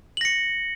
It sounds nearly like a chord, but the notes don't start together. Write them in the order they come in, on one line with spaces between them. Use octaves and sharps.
F#7 A#6 C#7